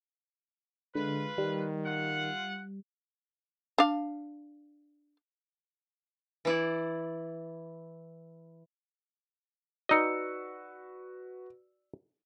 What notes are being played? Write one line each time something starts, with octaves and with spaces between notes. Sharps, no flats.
D3 G#3 F4 B4
D#3 G3
F4 F#5
D4 F5
E3 E4 D5
D#4 F#4 B4 D5 D#5 E6 C#7